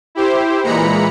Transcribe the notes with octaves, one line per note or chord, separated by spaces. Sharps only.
E4 G4 C5
A#2 E3 G#3 A#5 B5 C#7